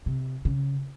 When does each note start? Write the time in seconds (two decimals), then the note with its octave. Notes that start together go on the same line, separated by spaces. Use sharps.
0.06 C3
0.45 C#3